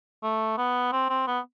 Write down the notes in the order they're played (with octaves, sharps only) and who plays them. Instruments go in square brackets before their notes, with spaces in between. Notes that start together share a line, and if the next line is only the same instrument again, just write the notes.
[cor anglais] A3
B3
C4
C4
B3